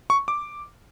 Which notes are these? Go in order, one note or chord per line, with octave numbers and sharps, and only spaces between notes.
C#6
D6